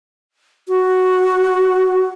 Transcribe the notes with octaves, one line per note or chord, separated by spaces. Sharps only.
F#4